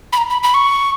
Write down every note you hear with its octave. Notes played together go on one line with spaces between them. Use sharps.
B5
A#5
B5
B5
C#6